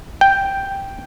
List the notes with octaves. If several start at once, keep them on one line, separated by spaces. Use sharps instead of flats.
G5